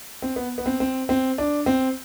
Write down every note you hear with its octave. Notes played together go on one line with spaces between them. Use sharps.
C4
B3
B3
C4
C4
C4
D4
C4